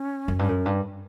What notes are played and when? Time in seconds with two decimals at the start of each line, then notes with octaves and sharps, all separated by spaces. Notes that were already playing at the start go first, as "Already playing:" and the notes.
Already playing: C#4
0.28 F#2
0.39 G2
0.48 F#2
0.65 G2